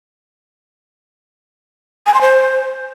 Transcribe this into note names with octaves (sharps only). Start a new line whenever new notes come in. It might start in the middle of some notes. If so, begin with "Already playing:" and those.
G#5
C6
C5